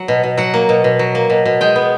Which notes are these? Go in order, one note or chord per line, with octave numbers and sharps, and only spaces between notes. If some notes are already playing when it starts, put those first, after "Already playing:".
Already playing: F#3 F#5
B2
B2
F#3 F#5
A#3
B2
B2
F#3
A#3
B2
B2
G#3 G5
B3